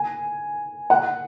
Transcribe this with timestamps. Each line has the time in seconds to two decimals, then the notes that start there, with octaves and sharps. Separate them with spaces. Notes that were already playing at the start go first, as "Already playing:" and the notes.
Already playing: G#5
0.90 F#5